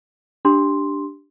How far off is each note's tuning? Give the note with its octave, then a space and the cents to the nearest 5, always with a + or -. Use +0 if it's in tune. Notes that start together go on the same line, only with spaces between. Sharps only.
D4 +0 G4 +0 C6 +0